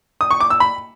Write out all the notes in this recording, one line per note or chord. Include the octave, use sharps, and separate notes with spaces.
D#6
C#6
D6
E6
B5